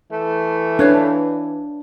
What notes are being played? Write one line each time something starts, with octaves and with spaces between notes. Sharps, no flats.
E3 A3
D4 B4 C#5 F5